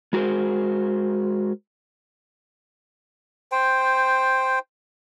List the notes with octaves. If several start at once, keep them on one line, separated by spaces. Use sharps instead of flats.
G#3 F#4 G#4 A#4 C5
C5 G5